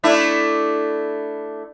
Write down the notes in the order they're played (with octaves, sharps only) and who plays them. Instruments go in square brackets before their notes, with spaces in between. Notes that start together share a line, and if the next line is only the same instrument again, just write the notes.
[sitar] A3 D4 E4